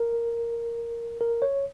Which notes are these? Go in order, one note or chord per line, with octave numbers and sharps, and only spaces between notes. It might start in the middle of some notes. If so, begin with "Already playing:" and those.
Already playing: A#4
A#4
C#5